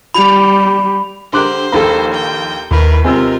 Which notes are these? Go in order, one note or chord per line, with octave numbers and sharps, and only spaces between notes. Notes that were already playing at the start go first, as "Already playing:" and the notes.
G3 G4 B5 F7
D3 G4 A#4 C5 C6 D6 F#6
A#1 D#2 A#3 A4 B5
G5
D#2 A2 A#4 B4 B5
C3 G#3 C4 F4 A#4 G#5 E6